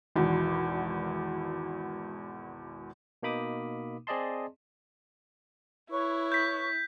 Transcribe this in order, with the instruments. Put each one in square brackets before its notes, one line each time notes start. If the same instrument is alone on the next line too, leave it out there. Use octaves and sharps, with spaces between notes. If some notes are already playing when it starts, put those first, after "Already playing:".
[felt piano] G#1 E2 B2
[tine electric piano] B2 A#3 D#4 B5 D6 D#6
C4 G#4 D5 D#5 A5 C6
[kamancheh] E4 [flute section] B4 C#5 C#6
[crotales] G6 B6